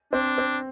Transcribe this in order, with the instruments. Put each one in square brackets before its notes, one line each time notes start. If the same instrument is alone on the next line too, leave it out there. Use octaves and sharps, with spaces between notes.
[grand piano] C4 [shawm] D4
[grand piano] C4